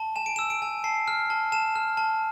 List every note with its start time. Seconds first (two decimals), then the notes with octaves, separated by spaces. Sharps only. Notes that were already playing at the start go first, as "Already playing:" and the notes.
Already playing: A5
0.16 G#5 E7
0.26 D7
0.36 E6 E7
0.50 D7
0.62 G#5
0.84 A5 C7
1.08 F6
1.30 A5
1.52 A5 E7
1.76 F6
1.97 A5